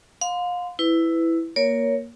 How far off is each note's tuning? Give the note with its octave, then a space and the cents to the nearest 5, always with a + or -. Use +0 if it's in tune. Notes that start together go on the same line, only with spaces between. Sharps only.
F5 +30 C6 -25
E4 +0 B4 +20
A#3 +10 A#4 +0 C#5 +15